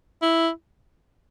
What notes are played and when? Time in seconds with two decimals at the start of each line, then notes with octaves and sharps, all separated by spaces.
0.22 E4